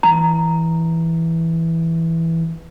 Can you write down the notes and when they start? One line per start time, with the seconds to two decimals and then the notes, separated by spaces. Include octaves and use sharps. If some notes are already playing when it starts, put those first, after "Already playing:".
0.03 E3 A#5